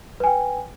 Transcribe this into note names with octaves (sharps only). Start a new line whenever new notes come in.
B4 G5 G#5